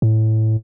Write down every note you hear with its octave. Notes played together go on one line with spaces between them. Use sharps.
A2